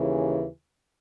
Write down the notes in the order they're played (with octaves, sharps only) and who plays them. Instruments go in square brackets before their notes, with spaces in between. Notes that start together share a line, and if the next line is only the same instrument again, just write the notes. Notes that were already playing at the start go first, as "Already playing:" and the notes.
Already playing: [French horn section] D#2 C#3 E3